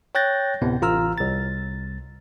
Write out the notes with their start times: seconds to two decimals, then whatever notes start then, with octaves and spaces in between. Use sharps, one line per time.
0.15 C#5 G5 F#6 G6 A6 A#6
0.61 D2 A2 C3 B3
0.82 A1 F4 A#5 E6 F6
1.18 C2 A6